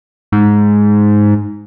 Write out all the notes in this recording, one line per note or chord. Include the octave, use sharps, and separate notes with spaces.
G#2